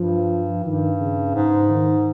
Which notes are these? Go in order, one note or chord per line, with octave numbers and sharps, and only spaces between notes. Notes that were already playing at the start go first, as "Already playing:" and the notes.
Already playing: G2 F3
G2 D#3
C#3
G#2
D#3